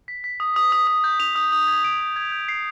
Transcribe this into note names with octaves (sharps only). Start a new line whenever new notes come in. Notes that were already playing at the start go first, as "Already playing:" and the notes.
B6
B6
D#6
D#6
D#6
D#6
G6
F7
D#6
D#6
G#6
D7
D#6
G#6
G6
C7